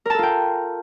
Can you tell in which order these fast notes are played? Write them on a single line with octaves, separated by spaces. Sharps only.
A#4 A5 A4 F4 G5